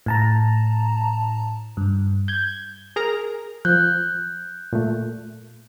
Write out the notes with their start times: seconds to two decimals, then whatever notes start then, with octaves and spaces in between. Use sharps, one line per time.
0.06 A2 A5 A#5
1.77 G2
2.28 G6 G#6
2.96 G#4 A#4 A#5
3.65 F3 F#6 G6
4.73 A#2 A3